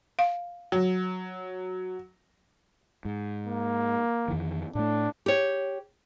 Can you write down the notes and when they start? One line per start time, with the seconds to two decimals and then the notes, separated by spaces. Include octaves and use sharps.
0.19 F5
0.72 F#3
3.05 G#2
3.46 A#3
4.28 F2 D#3 E3
4.75 A2 A3 D4
5.26 G4 C#5